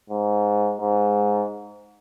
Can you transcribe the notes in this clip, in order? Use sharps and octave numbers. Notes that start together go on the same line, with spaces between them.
G#2
G#2